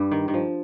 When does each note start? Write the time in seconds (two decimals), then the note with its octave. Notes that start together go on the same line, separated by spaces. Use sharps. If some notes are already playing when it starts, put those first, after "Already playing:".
Already playing: G2 G3
0.12 D#3
0.28 D#3
0.34 F3